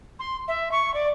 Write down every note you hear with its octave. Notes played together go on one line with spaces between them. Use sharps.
C6
E5
C#6
D5